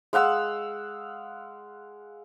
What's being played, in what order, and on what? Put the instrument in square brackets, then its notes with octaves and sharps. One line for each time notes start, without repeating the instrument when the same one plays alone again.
[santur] G#3 F5 F#5 E6